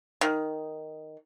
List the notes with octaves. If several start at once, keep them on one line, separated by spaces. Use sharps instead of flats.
D#3